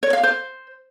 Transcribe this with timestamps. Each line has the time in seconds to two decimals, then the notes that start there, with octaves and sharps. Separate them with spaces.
0.03 C#5
0.13 F5
0.23 C5